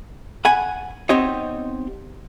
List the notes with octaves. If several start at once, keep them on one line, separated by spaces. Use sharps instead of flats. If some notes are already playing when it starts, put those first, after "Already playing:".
F#5 G#5 B5
B3 C4 D#4 G4 C#5 D#5